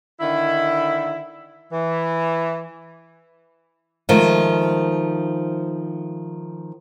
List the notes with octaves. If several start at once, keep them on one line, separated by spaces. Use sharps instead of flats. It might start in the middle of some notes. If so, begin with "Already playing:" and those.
D3 D#3 E4
E3
D#3 F3 G#3 A3